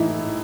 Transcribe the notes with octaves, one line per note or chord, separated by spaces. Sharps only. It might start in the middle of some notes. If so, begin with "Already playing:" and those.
Already playing: A2 E3 D#4 E4